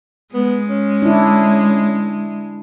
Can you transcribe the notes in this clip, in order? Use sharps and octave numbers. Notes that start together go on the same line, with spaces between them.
G#3 B3
C#4
D4 E4